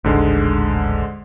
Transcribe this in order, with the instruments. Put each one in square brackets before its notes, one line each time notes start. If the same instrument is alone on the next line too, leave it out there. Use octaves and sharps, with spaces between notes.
[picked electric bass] D#1 A1 [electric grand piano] G#2 D3 G#3